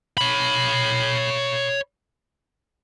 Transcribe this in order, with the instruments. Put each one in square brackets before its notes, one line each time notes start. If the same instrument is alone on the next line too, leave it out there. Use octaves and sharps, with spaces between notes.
[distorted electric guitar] C#5 B5